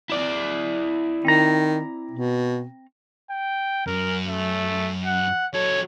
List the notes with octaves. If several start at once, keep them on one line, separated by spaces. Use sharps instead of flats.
E4 D5
D#3 C4 A#5
B2
G5
F#2 A#4
A3
F#5
F#3 A4 C#5